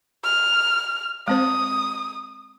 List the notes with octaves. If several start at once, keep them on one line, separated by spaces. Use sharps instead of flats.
F6
G#3 C4 C5 D#6